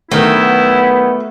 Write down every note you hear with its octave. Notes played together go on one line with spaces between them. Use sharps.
D#3 F#3 A3 B3 E4